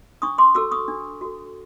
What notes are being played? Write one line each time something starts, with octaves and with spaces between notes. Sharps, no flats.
D4 C#6 D#6
C6 D6
F#4 A4 D6 E6
C#6 D#6
D4
F#4 A4